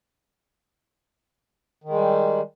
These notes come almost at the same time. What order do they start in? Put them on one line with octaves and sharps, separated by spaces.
D#3 G#3 G3